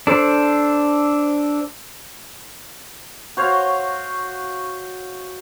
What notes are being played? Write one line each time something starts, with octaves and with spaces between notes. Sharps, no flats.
D4 A4 C5
F#4 C5 C#5 F5